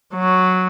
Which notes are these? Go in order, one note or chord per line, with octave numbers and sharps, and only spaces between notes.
F#3